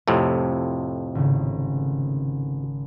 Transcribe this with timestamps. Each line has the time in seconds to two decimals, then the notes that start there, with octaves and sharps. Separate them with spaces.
0.08 F2 A2 C3 C4
1.15 G#1 C#3